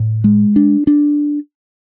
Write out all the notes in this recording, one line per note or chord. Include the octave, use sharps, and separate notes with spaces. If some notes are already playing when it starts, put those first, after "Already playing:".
Already playing: A2
G#3
D4
D4